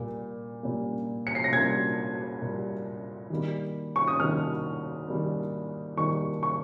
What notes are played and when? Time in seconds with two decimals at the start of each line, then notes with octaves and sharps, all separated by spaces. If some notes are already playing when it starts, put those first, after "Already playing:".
Already playing: A#2 G3 A#3
0.63 A#2 G3 A#3
1.27 C#7
1.35 C7
1.44 A#6
1.52 A#2 G3 A#3 G#6
2.42 A#2 G3 A#3
3.30 D#3 G3 A#3
3.96 C#6
4.08 D#6
4.20 D#3 G3 A#3 F6
5.08 D#3 G3 A#3
5.97 D#3 G3 A#3 C#6
6.43 C#6